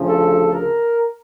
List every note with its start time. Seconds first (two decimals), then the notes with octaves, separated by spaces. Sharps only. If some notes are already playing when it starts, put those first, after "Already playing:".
Already playing: D2 C#3 F3
0.09 A4
0.53 A#4